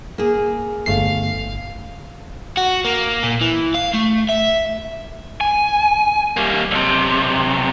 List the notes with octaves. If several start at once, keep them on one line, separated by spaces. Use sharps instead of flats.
A#3 G#4
G1 A3 F5 C7
F#4
A#3
A#2
E3
F5
A3
E5
G#5
G3 A#3
B1 C3